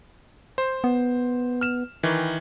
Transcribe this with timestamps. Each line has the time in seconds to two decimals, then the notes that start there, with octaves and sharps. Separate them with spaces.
0.58 C5
0.84 B3
1.61 F6 E7
2.03 D#3 E3